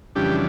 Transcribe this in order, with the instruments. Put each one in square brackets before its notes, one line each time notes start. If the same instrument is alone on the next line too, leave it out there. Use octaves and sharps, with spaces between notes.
[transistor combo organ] F2 C#3 E3 G3 D4 G4